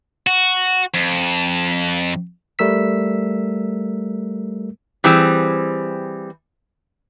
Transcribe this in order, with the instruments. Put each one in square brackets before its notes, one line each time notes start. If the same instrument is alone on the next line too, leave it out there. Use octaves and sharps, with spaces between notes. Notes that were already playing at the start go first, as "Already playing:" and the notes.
[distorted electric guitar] F#4
F2
[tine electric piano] G3 A3 A#4 E6 B6
[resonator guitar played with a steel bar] E3 G3 C4 G#4